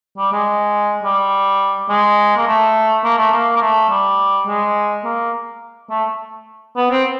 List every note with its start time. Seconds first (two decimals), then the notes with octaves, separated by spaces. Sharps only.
0.18 G3
0.32 G#3
1.04 G3
1.89 G#3
2.37 A#3
2.47 A3
3.04 A#3
3.18 A3
3.33 A#3
3.56 A#3
3.61 A3
3.90 G3
4.47 G#3
5.05 A#3
5.90 A3
6.77 B3
6.91 C4